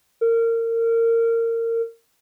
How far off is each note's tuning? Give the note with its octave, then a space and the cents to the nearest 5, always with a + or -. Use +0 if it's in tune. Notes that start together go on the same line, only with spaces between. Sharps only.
A#4 -25